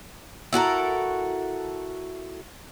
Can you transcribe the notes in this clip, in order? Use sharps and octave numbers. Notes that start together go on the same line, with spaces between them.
E4 F#4 A4 A#4